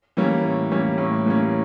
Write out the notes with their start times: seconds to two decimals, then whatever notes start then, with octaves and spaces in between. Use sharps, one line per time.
0.17 E3 G3 A#3 C#4
0.45 A2
0.72 E3 G3 A#3 C#4
0.98 A2
1.26 E3 G3 A#3 C#4